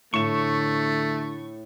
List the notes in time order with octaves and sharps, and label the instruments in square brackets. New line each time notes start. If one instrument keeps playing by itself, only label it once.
[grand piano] A2 E7 [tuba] D3 [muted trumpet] A3 [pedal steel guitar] C#6